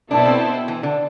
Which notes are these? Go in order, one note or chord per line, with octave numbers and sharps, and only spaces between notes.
B2 B3 D4 E4 A4 C5
C4
E3
D3